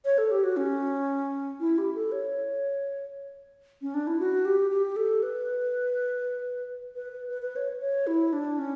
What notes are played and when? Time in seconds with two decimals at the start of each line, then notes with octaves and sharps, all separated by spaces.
0.05 C#5
0.18 A4
0.31 G4
0.44 F#4
0.57 C#4
1.60 E4
1.78 G4
1.95 A4
2.12 C#5
3.82 C#4
3.94 D4
4.07 E4
4.19 F#4
4.45 G4
4.71 G4
4.96 A4
5.23 B4
6.95 B4
7.12 B4
7.29 B4
7.42 B4
7.56 C#5
7.81 C#5
8.07 E4
8.33 D4
8.59 C#4